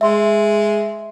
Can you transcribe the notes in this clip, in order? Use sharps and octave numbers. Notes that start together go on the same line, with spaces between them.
G#3 E5 C6